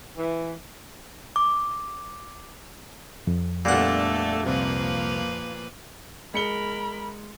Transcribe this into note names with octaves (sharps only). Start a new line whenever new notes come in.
E3
D6
F2
A#2 G3 A3 B3 D4 A4 F#5
C2 C3 F3 A#3 B4
G#3 A#4 B5 C#7 G7